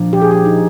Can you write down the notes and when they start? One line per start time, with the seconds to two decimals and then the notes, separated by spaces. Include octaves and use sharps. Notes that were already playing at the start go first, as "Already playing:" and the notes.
Already playing: A#2 F3 A#3 D4
0.13 A#1 G4
0.22 G#4
0.31 G4
0.45 D#4